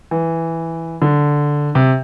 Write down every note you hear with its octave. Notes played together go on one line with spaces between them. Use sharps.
E3
D3
C3